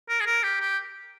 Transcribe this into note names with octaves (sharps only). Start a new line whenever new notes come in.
A#4
G#4
A#4
G4
G4